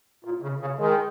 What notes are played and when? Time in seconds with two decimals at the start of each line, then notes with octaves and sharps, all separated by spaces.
0.24 A#2
0.42 C#3
0.60 C#3
0.79 D#3 G#3